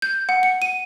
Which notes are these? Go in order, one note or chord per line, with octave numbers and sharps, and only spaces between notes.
G6
F#5
C#7
D#7